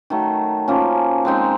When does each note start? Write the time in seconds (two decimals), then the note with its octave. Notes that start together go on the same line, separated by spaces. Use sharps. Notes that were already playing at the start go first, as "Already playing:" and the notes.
0.10 D#3 F#3 A3
0.68 F3 A#3 C#4
1.25 G#3 C4 D#4